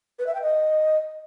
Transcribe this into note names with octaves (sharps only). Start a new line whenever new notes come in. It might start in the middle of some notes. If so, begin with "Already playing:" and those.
B4
E5
G5
D#5